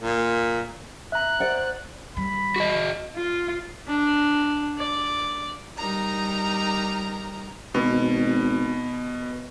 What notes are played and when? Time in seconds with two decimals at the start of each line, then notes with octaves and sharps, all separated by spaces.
0.02 A#2
1.12 E5 A#5 F#6
1.40 C5 D5 F#5
2.17 D#3 G3 B5
2.56 F#4 G#4 D#5
3.16 F4
3.88 D4
4.78 D5
5.77 G3 D#4 A#4 A#5
7.74 G#1 B2